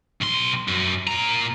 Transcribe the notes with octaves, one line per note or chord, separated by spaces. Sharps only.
B1 C6
F#2
A#2 A#5